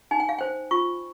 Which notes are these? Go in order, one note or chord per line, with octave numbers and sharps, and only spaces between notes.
D#4 G#5
G5
F5
C5 G5
F4 C#6